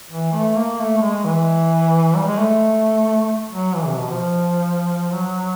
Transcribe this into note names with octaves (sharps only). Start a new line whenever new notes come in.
E3
A3
A#3
A3
A3
G#3
E3
G3
G#3
A3
F#3
E3
C3
B2
F3
F#3